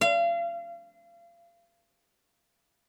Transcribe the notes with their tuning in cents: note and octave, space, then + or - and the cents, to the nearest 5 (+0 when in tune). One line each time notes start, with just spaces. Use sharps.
F5 -35